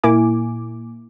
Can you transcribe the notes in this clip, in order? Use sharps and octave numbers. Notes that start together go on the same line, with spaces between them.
A#2 A#3 E4 G#5 D6